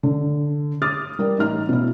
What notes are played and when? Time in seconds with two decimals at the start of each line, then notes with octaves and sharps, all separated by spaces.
0.03 D3
0.82 D6 D#6 F6 A6
1.19 G3 A#4 D5
1.38 A1 D#4 F6
1.69 B2 E4